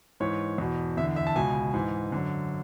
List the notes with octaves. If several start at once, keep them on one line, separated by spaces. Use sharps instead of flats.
G#2 E3 C#5
E2 B2
E2 D3 E5
E5
A5
C#2 B2 G#5
G#2 E3
F#2 D3